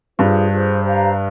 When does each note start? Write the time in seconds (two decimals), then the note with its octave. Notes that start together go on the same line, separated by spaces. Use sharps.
0.19 G2 F4 G#4 C5
0.51 F4 G#4 C5
0.83 G4 C5 F5 A#5